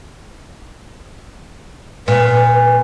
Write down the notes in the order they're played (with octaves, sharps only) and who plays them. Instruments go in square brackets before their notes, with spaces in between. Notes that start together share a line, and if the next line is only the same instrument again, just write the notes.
[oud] A#2 [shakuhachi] B4